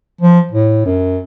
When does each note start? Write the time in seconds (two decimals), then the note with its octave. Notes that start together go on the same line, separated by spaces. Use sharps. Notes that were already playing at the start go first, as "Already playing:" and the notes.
0.21 F3
0.51 A2
0.86 F#2